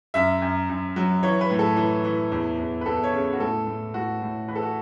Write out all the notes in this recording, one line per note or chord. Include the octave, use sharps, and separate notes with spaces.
F#2 E5
F#2
F#2
F#3
E3 C#5
B4
A2
A4
E3
E3
E2
E2
B4
E2 A4
C#5
C#3
F#4
A2 A4
A2
A2 F#4
A2
E3 B4
A4
F#4